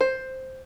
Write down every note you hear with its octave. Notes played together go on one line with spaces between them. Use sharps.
C5